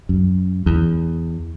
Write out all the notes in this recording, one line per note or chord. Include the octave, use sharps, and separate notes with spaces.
F#2
E2